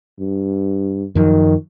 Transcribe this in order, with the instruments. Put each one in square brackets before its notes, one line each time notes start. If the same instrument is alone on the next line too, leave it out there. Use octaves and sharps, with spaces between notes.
[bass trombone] G2
[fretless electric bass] F#2 F3 F#3 [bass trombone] D#3